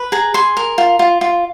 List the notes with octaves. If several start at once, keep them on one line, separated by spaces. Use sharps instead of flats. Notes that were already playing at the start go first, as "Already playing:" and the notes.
Already playing: B4
G#4 A#5
G#4 C6
A#4
F4
F4
F4